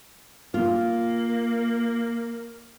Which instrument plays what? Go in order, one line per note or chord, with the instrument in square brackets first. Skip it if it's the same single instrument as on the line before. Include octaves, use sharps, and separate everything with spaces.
[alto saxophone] A#3 [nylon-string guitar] F4